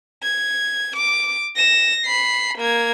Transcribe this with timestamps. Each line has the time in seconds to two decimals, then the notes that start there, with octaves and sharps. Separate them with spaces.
0.23 G#6
0.96 D6
1.56 A#6 E7
2.06 B5 C7
2.59 A#3 G#6